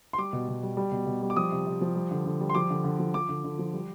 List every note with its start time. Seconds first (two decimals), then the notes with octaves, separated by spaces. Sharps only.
0.13 C6
0.18 G3 D6
0.33 B2
0.48 B2
0.63 G3
0.77 G3
0.92 B2
1.07 B2
1.22 G3
1.30 D6
1.36 F3 D#6
1.51 C3
1.66 C3
1.81 F3
1.95 G3
2.11 D3
2.25 D3
2.41 G3
2.50 C6
2.55 F3 D6
2.70 D3
2.84 D3
2.99 F3
3.14 F3 D6
3.29 D3
3.44 D3
3.59 F3
3.73 G3